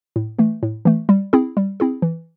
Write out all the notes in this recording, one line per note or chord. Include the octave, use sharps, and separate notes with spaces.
A2
E3 A3
A2
E3 A3
G3
C4 E4 G#4
G3
C4 E4 G#4
E3